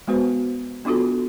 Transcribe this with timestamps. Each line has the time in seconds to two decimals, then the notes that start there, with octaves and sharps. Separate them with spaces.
0.07 G#3 B3 F#4 B4 C5
0.85 B3 D4 F4 F#4 A4